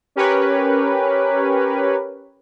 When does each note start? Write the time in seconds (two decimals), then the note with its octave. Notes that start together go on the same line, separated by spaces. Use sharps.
0.16 C#4 G4 A#4 B4 C#5